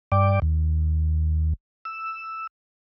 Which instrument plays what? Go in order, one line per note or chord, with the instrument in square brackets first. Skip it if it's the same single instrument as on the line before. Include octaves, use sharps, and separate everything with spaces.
[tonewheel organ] G2 D5 G5 D6
D#2
E6